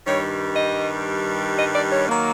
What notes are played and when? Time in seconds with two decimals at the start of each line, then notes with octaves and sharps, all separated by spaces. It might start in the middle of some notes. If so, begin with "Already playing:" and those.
0.05 G2 D#3 G3 C#5
0.56 D#5
1.58 D#5
1.75 D5
1.92 C#5
2.09 D#3 F#3 A#3